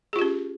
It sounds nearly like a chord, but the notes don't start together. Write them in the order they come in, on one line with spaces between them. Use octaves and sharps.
G#4 F4 G4 C#4